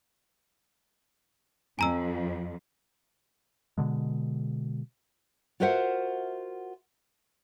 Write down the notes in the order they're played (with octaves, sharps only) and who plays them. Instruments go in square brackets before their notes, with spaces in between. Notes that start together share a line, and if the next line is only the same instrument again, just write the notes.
[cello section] F2 [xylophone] G#5 A#5 E6
[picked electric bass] B2 D3 G#3
[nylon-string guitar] F4 F#4 A#4 C5 E5 F#5